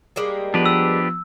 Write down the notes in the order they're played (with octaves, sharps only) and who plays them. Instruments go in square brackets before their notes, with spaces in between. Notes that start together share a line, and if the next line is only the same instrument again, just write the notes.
[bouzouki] G3 G#3 A#3
[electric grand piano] F3 B3 [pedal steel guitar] D4 G4 B4
[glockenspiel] E6